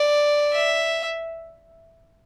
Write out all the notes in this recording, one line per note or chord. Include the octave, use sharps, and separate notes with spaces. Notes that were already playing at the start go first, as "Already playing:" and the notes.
Already playing: D5
E5